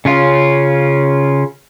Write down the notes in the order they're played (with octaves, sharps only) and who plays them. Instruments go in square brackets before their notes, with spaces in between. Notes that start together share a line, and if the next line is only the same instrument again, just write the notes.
[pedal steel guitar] C#3 C#4 F4